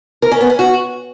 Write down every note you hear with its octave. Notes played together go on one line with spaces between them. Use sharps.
A#4
C#4
B3
C#4
F#4